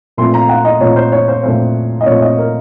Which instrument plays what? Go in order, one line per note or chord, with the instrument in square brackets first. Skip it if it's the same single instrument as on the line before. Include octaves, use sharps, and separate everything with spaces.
[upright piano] A#2 F3 A3 C4 C6
A#5
F#5
D#5
A#2 F3 A3 C4 C#5
C5
C#5
C5
A#2 F3 A3 C4 C5
D#5
A#2 F3 A3 C4 C#5
D#5
A#4